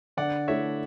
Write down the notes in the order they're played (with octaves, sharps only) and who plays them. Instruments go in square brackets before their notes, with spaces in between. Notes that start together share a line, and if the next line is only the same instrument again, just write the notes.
[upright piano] D3 [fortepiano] D5 F#5
[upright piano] A3 E4 A4 [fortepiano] C#5 E5